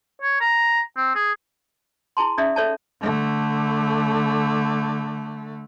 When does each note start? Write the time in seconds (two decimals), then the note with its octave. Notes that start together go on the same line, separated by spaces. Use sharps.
0.22 C#5
0.40 A#5
0.97 C4
1.15 G#4
2.17 E4 G#4 A5 C6
2.38 C#4 D#4 G#4 D5 E5 D#6
2.56 A4 C#5 D5 E5 A5
3.01 D3 A3